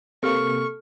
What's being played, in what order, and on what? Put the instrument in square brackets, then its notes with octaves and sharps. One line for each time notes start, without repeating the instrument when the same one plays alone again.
[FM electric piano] C3 A#3 [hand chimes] A4 F6 [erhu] C#6